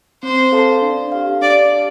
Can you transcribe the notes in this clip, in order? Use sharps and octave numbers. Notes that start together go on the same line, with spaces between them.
C4 C5
A4 F5 A5
D4
G4 F5
D4 D5
G4 F5 A5